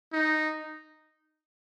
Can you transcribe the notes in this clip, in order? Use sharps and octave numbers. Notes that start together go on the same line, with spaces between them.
D#4